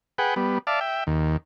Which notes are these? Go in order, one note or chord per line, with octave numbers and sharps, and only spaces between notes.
G#4 B4 F#5 G5
G3 B3
D5 E5 F5 A5
E5 G5
D#2